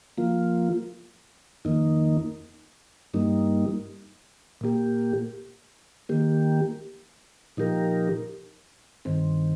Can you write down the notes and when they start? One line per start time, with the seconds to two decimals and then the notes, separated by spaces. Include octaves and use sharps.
0.18 F3 A#3 F4
1.65 F2 D#3 A#3 D#4
3.14 G2 G3 A#3 D#4
4.61 A#2 A#3 G4
6.09 D#3 A#3 G4
7.57 A#2 F3 D#4 G4 A#4
9.05 G2 D#3 C4